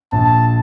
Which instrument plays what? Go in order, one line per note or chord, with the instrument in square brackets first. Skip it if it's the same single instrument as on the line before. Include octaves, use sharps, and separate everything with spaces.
[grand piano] A#1 [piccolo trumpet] A5